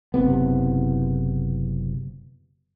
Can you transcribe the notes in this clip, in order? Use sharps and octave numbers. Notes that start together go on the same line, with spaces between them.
F#1 C3 B3